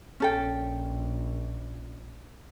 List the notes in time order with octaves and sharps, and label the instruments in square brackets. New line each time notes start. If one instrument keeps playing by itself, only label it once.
[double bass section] A#1 [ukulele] C#4 A4 G5